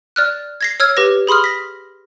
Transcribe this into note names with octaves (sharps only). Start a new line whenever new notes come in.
D5 F6 F#6
G#6 A#6 C7
C#5 E6 F6 G#6
G4 B4 A#6
G#4 B5 C6 D#6 F6
A#6 B6